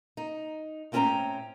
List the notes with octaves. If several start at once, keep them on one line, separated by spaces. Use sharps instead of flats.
D#4
A2 C4 C#4 G#4 G5 A#5